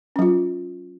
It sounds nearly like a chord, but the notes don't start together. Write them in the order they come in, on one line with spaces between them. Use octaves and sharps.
C#4 F#3 F4